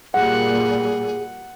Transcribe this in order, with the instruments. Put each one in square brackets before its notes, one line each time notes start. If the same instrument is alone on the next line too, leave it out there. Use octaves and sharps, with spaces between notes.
[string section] A#2 G3 [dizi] G#4 [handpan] F#5